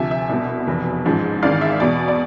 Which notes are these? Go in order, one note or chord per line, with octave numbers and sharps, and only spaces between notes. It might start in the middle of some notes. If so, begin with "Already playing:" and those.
Already playing: D2 C3 F3 E5 G#5
E5
C2 B2 E5
F1 E2 B2
A1 G#2 F3
G#1 G#2 E3 D5 F5
E5
E2 B2 D5
D5